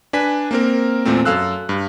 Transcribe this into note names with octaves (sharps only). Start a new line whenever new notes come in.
D4 B4 G#5 B6
A#3 C4 A#4
E2 A#2 A3 C4
F#2 A4 F5 E6 F#6
G2